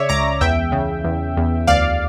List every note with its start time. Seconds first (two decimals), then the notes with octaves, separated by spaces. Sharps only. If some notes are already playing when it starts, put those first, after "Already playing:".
Already playing: C#3 C#5 D5 E5
0.09 C#2 A#5 D6
0.41 E2 E5 G5
0.72 C#3
1.04 E2
1.37 E2
1.67 D2 D5 F5